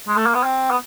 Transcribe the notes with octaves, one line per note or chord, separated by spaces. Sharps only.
G#3
A3
A#3
B3
C4
B3